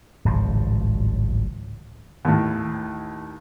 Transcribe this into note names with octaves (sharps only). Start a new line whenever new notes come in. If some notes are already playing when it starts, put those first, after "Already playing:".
D1 G#1 C#2 F3
D#2 A2